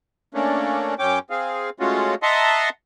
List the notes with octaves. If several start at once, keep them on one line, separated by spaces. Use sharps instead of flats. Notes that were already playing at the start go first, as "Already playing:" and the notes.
A3 A#3 C#4 D4
F#2 C#4 G5 D6
C4 G#4 F5
G#3 A3 C#4 F4 F#4
D#5 E5 F#5 A5 A#5 C6